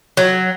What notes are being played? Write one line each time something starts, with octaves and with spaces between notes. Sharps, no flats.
F#3